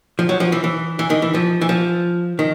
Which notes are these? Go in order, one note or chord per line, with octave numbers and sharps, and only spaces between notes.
F3
F#3
F3
E3
E3
E3
D#3
E3
F3
E3
F3
D#3